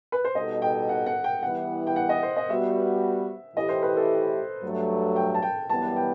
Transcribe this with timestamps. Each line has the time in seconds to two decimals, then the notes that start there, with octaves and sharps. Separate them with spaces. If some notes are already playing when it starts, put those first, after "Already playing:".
0.12 B4
0.25 C5
0.35 B2 G3 D#4 A4 D#5
0.62 G5
0.89 F#5
1.06 F#5
1.24 G5
1.43 E3 G3 B3 E4 F#5
1.87 G5
1.96 F#5
2.09 D#5
2.23 C5
2.37 D#5
2.50 G3 B3 F#4 E5
3.56 A2 E3 A3 E4 G4 D#5
3.69 C5
3.83 B4
3.97 A4
4.63 G2 F#3 A3
5.16 G5
5.35 A5
5.42 G5
5.70 F#2 E3 G3 B3 A5
5.96 G5